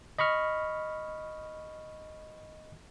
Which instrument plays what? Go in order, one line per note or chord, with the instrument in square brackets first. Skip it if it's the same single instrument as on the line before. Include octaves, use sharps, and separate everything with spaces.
[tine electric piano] D#5 B5 C#6 F6